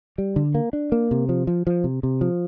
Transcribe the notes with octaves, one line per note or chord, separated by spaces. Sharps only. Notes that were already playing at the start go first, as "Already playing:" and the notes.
G3
D3
A#3
D4
A#3
C3
F3
F3
F3
C3
C3
F3